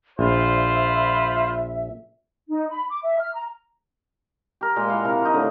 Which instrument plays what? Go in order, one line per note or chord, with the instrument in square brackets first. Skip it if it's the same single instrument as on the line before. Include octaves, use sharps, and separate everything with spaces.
[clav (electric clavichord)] A#1 [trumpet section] F4 C5 B5 [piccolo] E5
[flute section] D#4
B5
D6
E5
F6
A#5
[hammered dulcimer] G4 A#4
A#2 G#3 G5
A#3 E4 F5 F#5
C3 E4 A#4 A#5
F3 D#4
A2 D3 D#4